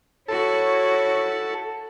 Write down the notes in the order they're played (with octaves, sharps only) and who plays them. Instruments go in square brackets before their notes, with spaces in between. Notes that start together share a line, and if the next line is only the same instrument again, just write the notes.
[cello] E4 F#4 [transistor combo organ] A4 [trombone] C#5